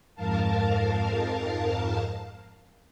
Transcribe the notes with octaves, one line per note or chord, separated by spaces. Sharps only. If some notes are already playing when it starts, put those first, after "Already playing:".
F2 G#2 A#4 F5 A5